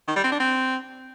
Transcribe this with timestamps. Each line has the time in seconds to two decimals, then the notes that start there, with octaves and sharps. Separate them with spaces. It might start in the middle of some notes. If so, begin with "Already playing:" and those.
0.08 D#3
0.16 G3
0.24 C4
0.32 D4
0.40 C4